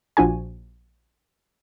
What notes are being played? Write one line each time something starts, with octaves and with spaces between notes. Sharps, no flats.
A#1 F3 D4 F#4 G#5